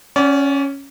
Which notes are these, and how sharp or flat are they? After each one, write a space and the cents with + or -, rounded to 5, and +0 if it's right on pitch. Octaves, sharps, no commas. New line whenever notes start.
C#4 +0 D5 -35 F#5 +30